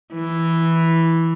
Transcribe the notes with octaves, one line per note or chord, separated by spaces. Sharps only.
E3